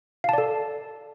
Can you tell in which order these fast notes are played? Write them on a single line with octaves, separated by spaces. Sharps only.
F5 A5 D5 A4